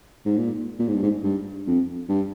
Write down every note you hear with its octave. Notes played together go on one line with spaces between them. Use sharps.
G#2
A#2
A#2
G#2
G2
G#2
G2
F2
G2